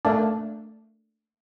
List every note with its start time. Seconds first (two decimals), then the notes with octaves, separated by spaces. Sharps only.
0.05 A3 A#3 D4